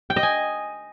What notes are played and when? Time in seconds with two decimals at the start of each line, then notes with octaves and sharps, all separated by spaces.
0.10 G5
0.16 D#5
0.23 G#5